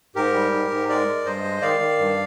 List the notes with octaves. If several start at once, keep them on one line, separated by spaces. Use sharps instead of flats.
G#2 G4 A#4
G3
G#2
G#2
G#3 A#4 D5
G#3
G2 C5 D#5
G#3
D#3 D5 F5
D#3
G2